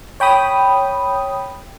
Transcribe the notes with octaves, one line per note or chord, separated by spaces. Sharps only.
C#5 G5 B5 D#6